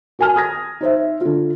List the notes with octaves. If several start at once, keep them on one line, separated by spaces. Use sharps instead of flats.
F#4 A#4 G#5 A5 F6
D#6 G#6 A#6
D#4 C5 E5
D3 F4